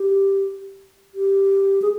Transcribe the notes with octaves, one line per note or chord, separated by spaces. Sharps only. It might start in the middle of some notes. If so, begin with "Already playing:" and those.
Already playing: G4
G4
G#4